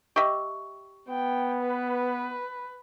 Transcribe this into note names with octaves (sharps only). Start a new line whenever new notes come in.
G4 D#5 E5 C#6
B3 G5
B4